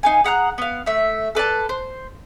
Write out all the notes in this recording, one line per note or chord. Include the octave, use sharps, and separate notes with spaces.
D#4 F5 G#5
G#4 F#5 A#5 F#6
B3 F5
A3 E5
A4 B4 D5 A5
C5